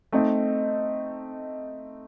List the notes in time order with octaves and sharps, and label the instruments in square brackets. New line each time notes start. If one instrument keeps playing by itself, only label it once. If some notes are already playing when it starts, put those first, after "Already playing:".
[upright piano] A3 C4 D#4